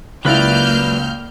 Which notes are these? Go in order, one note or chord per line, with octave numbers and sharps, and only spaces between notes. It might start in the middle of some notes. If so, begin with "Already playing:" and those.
C#2 F#3 A#3 E4 B4 D5 F6 G6